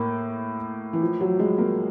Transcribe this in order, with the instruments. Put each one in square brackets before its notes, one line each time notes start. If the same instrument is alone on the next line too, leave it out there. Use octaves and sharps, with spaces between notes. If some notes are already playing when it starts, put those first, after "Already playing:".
Already playing: [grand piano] A2 A#3
[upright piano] E3
F3
F#3
G#3
A#3